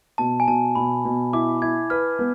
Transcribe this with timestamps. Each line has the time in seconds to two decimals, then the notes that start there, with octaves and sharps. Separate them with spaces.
0.18 B2 A5
0.40 G#5
0.48 B2 A5
0.75 B2 B5
1.05 B2
1.33 E4 D6
1.62 E4 G#6
1.90 B4 F6
2.19 B3